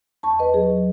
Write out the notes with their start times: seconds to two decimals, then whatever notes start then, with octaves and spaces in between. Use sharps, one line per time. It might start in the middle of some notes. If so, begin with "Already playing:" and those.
0.23 E2 A5 C#6
0.39 E2 B4 D#5
0.54 F#3 G#4
0.70 F#3